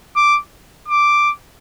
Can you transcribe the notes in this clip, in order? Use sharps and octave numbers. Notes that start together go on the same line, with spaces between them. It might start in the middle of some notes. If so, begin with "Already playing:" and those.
D6
D6